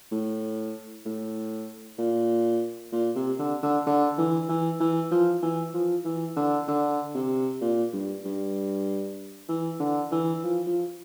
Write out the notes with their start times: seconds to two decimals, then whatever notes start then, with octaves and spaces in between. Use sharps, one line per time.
0.12 A2
1.06 A2
1.99 A#2
2.92 A#2
3.16 C3
3.39 D3
3.63 D3
3.87 D3
4.18 E3
4.49 E3
4.80 E3
5.11 F3
5.43 E3
5.74 F3
6.05 E3
6.37 D3
6.68 D3
7.15 C3
7.61 A#2
7.94 G2
8.25 G2
9.49 E3
9.80 D3
10.12 E3
10.43 F3
10.67 F3